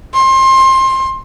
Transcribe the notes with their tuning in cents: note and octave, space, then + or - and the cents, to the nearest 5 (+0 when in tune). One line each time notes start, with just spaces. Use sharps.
C6 +25